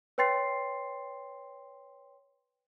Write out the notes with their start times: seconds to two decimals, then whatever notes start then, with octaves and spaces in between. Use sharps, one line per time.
0.18 B4 C#5 G5 C6 A6 C7